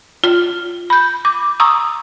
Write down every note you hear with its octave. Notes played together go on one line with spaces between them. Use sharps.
F4 F6
B5 G6
D6
A#5 C#6 D#6 E6